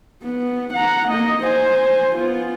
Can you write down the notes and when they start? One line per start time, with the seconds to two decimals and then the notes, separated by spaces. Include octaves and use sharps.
0.23 B3
0.74 F#5 A#5
1.09 A#3 D#5
1.43 C5 G#5
2.16 B3 F4